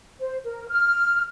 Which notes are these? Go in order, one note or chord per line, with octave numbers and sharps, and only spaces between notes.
C5
A#4
F6